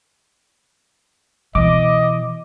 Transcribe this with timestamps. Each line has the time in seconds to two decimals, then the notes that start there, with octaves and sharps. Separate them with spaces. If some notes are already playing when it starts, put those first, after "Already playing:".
1.55 B2 E3 D#5 D6